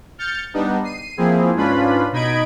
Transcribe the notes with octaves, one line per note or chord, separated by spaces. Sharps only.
F6 G6 A6 C#7
G3 B3 D4 D#4
C7 D#7
F3 A#3 C4 E4 G#4
G#2 C#4 D4 F4 B4 B5
B2 D#4 D#5 B5 G#6 D7